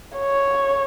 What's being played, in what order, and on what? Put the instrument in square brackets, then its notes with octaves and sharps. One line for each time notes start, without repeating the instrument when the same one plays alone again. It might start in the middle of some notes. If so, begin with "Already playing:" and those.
[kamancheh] C#5